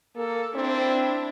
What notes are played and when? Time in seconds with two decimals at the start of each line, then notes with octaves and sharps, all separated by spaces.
0.16 A#3 A4
0.56 C4 D4 E4